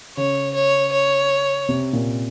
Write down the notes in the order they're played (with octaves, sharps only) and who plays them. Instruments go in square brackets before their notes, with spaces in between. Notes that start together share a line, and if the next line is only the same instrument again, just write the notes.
[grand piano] C#3 [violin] C#5
[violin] C#5
C#5
[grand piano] C3
A#2